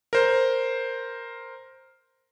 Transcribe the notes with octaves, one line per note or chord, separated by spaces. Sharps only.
A#4 C5